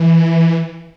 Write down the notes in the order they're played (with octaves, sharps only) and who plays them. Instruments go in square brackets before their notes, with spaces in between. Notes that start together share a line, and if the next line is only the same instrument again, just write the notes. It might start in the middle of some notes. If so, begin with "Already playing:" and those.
Already playing: [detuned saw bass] E3